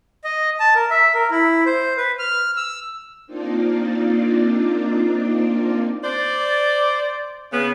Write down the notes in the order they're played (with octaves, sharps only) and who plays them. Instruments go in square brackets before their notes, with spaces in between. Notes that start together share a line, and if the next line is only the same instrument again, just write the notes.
[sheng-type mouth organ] D#5
A5
A#4
E5
A#4
E4
C5
B4
F6
E6
[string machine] A#3 C4 D4 D#4 F4 D5
[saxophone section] C5 D5
C#3 B3